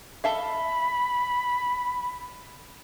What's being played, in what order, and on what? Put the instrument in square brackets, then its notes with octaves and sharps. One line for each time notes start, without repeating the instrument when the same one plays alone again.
[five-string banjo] A4 E5 F5 [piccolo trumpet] B5